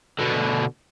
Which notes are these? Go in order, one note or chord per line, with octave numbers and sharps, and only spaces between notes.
B2 D3